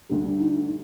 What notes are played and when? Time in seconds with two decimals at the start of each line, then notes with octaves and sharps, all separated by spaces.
0.09 D2 D3 G3 D4
0.40 D#4